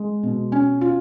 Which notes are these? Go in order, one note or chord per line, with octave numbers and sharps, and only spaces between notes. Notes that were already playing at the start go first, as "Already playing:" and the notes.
Already playing: G#3
B2
C#4
F4